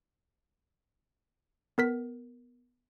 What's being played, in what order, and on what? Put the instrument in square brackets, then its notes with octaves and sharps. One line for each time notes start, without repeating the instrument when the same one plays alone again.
[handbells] B3 A#4 B6